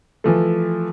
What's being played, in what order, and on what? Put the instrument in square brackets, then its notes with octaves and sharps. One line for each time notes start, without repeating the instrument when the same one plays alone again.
[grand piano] E3 F3 A3